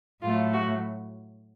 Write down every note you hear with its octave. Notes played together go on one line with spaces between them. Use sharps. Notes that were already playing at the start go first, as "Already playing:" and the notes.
A2 F#3 A3 F4
F#4